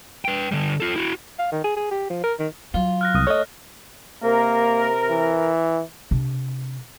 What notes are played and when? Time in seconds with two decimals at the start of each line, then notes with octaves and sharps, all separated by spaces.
0.25 B4 G5
0.52 D3 G3
0.80 F4 A4
0.96 E4 F#4
1.39 F5
1.52 D#3
1.64 G#4
1.77 G#4
1.91 G4
2.10 F3
2.24 A#4
2.39 D#3
2.74 F#3 F4
3.01 F6 F#6 A#6
3.14 C2 D#6
3.27 A3 C#5 D#5
4.23 C3 A#3 A#4
5.10 E3
6.11 C3 D4